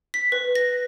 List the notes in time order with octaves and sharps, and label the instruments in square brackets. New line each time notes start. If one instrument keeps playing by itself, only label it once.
[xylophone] B6
B4
A#6